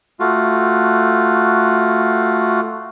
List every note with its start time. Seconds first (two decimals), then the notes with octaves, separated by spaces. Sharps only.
0.20 A3 F4 F#4